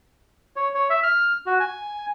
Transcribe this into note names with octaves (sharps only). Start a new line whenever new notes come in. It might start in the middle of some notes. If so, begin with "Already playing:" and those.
C#5
C#5
E5
F6
F#4
G#5